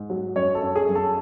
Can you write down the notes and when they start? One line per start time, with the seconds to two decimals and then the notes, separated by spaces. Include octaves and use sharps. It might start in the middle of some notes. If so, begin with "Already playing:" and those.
Already playing: G#2
0.10 F#3
0.36 F#2 C#5
0.55 A4
0.62 F#2
0.76 G#4
0.89 F#2
0.95 A4